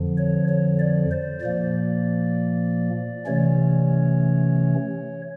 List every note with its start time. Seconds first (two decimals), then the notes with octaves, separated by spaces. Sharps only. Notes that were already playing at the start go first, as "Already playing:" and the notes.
Already playing: F2 D3 F3
0.18 C#5
0.48 C#5
0.79 D5
1.11 C5
1.41 A#2 F3 A#3 D5
3.26 C3 E3 A3 C#4 C#5